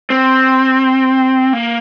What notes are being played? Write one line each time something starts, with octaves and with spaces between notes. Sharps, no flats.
C4
A#3